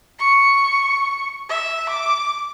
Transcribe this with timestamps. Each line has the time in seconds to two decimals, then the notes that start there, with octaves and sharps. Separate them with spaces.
0.19 C#6
1.49 E5
1.89 D6